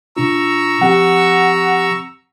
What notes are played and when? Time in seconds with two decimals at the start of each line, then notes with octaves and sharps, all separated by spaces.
0.17 B2 D4 F4 A#5 C#6 E6
0.81 F3 C4 G4 F#5